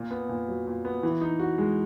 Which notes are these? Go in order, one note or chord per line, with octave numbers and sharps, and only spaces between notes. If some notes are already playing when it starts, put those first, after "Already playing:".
Already playing: A#2
B3
A#2
F#3
A#2
B3
E3
D#4
F#4
G#3